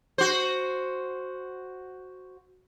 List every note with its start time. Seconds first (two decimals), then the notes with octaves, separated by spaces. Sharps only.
0.18 F#4 C5